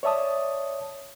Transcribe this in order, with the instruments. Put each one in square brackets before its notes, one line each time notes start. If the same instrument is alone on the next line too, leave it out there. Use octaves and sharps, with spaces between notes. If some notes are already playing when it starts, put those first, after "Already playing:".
[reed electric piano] C#5 D5 E5 A5 D#6